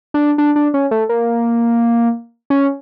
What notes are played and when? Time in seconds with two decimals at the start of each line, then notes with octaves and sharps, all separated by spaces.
0.14 D4
0.38 D4
0.56 D4
0.74 C#4
0.91 A3
1.09 A#3
2.50 C#4